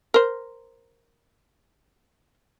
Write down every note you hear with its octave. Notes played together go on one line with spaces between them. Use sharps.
A#4 C5